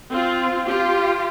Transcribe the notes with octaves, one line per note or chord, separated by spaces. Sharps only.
C4 F4
F4 G4